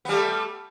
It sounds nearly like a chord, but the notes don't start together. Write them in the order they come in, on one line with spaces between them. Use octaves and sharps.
B3 G3 A3